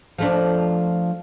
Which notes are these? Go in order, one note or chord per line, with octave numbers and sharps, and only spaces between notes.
F3 A3 D4